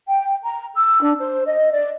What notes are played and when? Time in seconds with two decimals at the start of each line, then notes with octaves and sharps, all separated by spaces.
0.08 G5
0.44 A#5
0.75 E6
1.01 D4
1.19 C5
1.46 D#5
1.72 D5